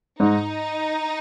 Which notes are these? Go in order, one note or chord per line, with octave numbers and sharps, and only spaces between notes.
G#2 D#4